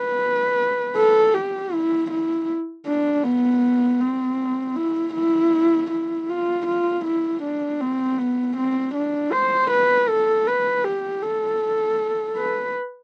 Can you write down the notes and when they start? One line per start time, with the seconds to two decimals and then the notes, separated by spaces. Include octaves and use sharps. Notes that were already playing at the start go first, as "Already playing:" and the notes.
Already playing: B4
0.96 A4
1.34 G4
1.73 E4
2.10 E4
2.86 D4
3.24 B3
4.01 C4
4.76 E4
5.14 E4
5.90 E4
6.29 F4
6.66 F4
7.05 E4
7.42 D4
7.80 C4
8.18 B3
8.56 C4
8.94 D4
9.32 C5
9.70 B4
10.08 A4
10.47 B4
10.84 G4
11.22 A4
12.36 B4